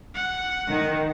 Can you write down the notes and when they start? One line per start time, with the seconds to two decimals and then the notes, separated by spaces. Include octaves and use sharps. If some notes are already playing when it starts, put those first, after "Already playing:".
0.15 F#5
0.69 D#3